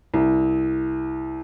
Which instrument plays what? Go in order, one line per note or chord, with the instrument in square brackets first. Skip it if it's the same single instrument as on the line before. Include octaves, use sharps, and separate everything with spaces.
[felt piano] C2